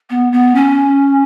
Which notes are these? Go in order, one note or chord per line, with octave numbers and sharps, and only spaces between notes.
B3
B3
C#4